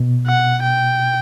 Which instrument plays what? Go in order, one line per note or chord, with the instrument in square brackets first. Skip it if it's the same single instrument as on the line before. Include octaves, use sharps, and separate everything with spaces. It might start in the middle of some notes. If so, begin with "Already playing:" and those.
Already playing: [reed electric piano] B2
[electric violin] F#5
G5